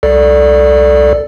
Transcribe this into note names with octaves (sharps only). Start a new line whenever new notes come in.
C2 A4 D5